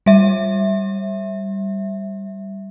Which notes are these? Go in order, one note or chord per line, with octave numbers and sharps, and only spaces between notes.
G3 E5